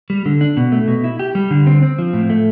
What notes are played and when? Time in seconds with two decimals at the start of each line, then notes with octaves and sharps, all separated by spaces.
0.10 G3
0.26 D3
0.41 D4
0.57 B2
0.72 A3
0.88 B2
1.04 E4
1.19 G4
1.35 G3
1.51 D3
1.67 C4
1.82 C4
1.99 F3
2.13 A2
2.30 A3